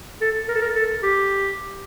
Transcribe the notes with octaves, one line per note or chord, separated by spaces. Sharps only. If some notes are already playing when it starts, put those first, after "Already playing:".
A4
A#4
A4
A#4
A4
G4